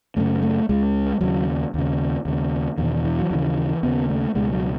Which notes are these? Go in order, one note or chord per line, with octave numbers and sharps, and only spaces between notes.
F#2 C#3 A3
A3
C#2 C#3 G#3
D#2 C#3 F#3
D#2 C#3
D#2 C#3
E2 B2 D#3
E3
F#3
D#2 C#3 E3
D#2 C#3 B3
A3
C#2 B2 G#3
F#3